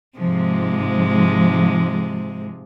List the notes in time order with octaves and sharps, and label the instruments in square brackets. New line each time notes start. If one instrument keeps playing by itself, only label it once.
[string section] G#2 F3 [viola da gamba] C3 G#3